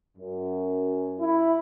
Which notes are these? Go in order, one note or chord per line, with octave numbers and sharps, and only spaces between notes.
F#2
E4